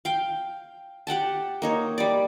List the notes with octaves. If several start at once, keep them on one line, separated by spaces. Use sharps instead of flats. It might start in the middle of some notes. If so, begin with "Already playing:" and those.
F5 G5
G4 F#5 G5 A5
A#3 D#4 C#5
G3 D5